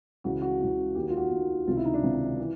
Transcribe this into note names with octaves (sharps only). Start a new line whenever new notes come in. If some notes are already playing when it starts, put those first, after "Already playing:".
C#2 C#3 E3 F#4
F#4
C#2 C#3 E3
D#2 D#3 G4
F#4
F4
F#4
D#2 D#3
C#2 C3 D#3 F4
E4
D#4
D4
C#2 C3 D#3
E3